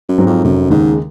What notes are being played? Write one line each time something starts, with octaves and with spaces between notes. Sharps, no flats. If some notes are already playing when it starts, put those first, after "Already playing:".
F#2
G#2 F#3 C4
F2
F1 F#2
D#2 G#2 C#3 G#3